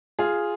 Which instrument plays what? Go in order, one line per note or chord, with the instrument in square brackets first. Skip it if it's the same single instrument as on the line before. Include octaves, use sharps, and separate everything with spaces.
[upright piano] F4 G#4